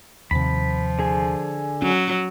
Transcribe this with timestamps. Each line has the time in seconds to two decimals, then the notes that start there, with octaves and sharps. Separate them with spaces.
0.31 D#2 C3 F3 B5
0.99 D3 G#4
1.82 F#3 C#4